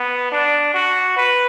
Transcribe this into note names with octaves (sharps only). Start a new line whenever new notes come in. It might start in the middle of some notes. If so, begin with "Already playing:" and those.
Already playing: B3
D4
F#4
B4